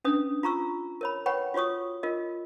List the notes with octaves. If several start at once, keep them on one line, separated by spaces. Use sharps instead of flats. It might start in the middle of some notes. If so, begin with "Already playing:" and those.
C#4 D4 B4 D#6
F4 A#5 C#6 E6
A#4 C#5 B5
B4 C#5 F#5 G5 B5 C#6
F4 F#4 C#5 C#6 D#6
F4 A#4 D#5